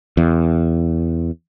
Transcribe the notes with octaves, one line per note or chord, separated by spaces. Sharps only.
E2